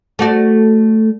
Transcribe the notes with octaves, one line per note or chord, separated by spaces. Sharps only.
A3 F#4 D5